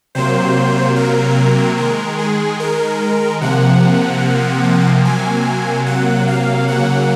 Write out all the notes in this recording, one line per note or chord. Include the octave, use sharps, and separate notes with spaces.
C3 F#3 A#3 C5
A#4
D#3 G#3 A#4
G#4
A#4
C3 F3 A#3 F#5
C3 F#3 A#3 G#5
F#5
F5
C#3 F#3 A#3 F#5